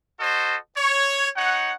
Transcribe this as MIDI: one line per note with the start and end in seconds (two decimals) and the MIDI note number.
0.19 0.56 66
0.19 0.56 69
0.19 0.56 72
0.19 0.56 75
0.76 1.28 73
1.35 1.72 63
1.35 1.72 73
1.35 1.72 78